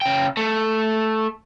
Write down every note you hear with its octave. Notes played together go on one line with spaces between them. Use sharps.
C#3 G5
A3